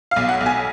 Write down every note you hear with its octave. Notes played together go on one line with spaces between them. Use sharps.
F5
B1
F#5
B1
G#5